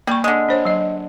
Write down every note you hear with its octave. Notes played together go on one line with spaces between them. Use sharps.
G3 A#3 C#6
D3 G#3
D4 C5 C#5
F#3 D#5